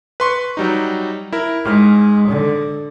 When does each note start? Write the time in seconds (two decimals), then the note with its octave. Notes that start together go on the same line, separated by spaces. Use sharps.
0.20 B4 C6 C#6
0.57 F#3 G3 D#4
1.32 E4 A#4
1.65 G#2 G#3 F6
2.29 D3